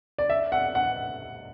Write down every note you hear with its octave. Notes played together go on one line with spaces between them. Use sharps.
D5
E5
F#5
F#5